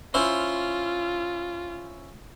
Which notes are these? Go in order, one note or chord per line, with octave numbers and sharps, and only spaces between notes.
C#4 E4 F4 C5